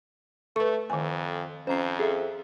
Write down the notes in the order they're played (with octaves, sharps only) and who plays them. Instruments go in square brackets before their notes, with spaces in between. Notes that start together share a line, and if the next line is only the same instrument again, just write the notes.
[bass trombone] A3 [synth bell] A4 [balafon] B4 C#6
[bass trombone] F2 [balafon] D#3 G#5
[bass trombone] F2 [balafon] C#4 [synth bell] C5 A#5 C7
[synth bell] G#4 A4 E5